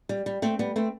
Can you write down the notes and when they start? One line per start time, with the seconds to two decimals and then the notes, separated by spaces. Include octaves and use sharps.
0.09 G3
0.26 G3
0.42 A3 C4
0.59 G3 B3
0.76 A3 C4